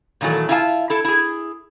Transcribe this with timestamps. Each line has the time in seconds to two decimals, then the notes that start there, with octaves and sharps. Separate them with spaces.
0.21 A#2 D#3 E3 F#3 A3
0.49 E4 F4 E5 F5 G#5 A5
0.90 E4 A4
1.05 E4 G#4